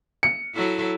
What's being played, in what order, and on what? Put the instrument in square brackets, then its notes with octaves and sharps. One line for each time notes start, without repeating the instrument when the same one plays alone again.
[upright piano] C#7
[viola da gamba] F#3 E4 A4